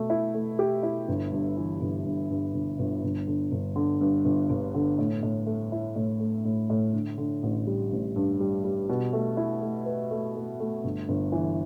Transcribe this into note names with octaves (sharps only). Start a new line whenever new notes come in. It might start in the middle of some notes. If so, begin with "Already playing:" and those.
Already playing: B2 A3
E4
A3
G4
E4
G1
G2
E3
G1
G2
G2
G1
G1
G1
D3
G1
D3
G2
G1
G1
D3
A2
A2
A3
E4
A2
A3
A2
A2
D3
D3
A1
G3
A1
G2
G3
G3
B2
A3
E4
A3
B4
A3
A3
A3
G1
G1
E3